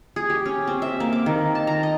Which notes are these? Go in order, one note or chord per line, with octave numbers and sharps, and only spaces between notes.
G#4
G4
C#4
C4
E5
A#3
D6
D#3
A5
A#5
D#5